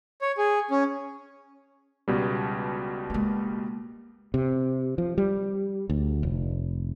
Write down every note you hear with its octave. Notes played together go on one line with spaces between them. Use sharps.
C#5
G#4
C#4
C#2 B2 G3
G#3 A#3
C3
F3
G3
D2
F1